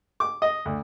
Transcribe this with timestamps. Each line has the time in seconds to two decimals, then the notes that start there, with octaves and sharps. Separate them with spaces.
0.20 D6
0.42 D#5
0.65 D2